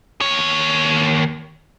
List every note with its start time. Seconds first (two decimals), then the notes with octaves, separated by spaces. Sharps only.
0.21 D#2 C#5